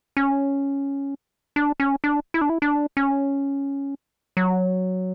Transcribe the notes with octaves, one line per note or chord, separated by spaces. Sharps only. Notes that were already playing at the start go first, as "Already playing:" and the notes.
C#4
D4
C#4
D4
E4
D4
E4
D4
C#4
F#3